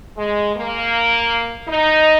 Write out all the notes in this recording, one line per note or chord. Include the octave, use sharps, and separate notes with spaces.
G#3
A#3
D#4